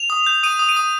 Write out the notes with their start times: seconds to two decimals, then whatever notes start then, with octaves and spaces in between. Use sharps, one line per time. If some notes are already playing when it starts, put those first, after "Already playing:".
Already playing: F7
0.10 D#6
0.26 G6
0.43 D#6 D#7
0.59 D#6
0.69 D#7
0.76 D#6